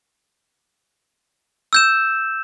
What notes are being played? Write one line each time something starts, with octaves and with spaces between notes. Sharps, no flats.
E6 G6 E7